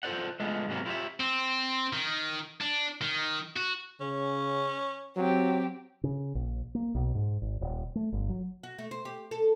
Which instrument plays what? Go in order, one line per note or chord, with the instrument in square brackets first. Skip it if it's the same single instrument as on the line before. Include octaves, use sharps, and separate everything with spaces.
[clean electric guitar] F4 A4 A#4 C5 D5 F#5
G#3 A3 B3 D4 F4 G#4
G#2 C3 F#3 A#3 B3
E4 F4 G4 A#4 C#5 E5
[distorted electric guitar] C4
D#3
D4
D#3
F#4
[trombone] C#3 [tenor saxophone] C#4
[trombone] F#3 [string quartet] C4 G4
[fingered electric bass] C#3
A#1
A#3
B1
G#2
G#1
D#1
A3
G1
F#3
[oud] F#4
A3
C5
G4
A4